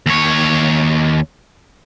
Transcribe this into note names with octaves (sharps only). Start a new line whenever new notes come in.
D#2 C#5